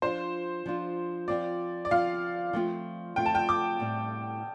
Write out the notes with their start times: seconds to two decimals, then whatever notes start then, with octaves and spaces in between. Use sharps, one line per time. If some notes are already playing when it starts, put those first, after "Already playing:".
0.02 F3 D4 F4 C5
0.66 F3 D4 F4
1.28 F3 C4 F4 D5
1.85 D5
1.91 F3 C4 F4 F5
2.53 F3 A3 C4 F4
3.16 F3 A3 C4 F4 G5
3.26 A5
3.35 G5
3.49 D6
3.80 A2 G3 C4